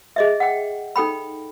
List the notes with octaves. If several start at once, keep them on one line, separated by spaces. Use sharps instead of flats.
G#4 D#5 E5
F#5 G5
D#4 A4 G5 B5